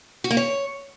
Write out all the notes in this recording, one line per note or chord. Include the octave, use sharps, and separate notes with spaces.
F#4
A#3
C#5